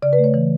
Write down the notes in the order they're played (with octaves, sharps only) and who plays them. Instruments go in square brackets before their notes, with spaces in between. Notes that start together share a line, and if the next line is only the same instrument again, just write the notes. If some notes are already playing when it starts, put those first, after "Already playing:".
[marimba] C#3 D5
B4
A3
C#5
E3